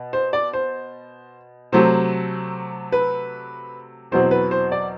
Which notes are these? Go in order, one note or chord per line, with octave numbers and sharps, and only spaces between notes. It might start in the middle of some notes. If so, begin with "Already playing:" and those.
Already playing: B2
C5
D5
C5
C3 F#3 A3 C4 C5
B4
E2 B2 F#3 C4 C5
B4
C5
D5